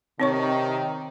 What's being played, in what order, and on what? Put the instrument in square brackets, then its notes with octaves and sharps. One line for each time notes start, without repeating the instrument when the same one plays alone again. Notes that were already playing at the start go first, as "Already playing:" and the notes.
[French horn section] C3 D#3 [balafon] C4 C#5 C#6